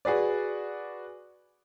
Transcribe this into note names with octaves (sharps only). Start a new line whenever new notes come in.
F#4 G#4 B4 D5